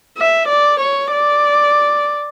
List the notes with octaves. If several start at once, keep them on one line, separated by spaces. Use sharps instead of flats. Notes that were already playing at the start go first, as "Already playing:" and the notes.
E5
D5
C#5
D5